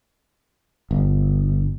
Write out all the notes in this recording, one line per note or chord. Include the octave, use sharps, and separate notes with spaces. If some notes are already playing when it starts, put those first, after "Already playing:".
G1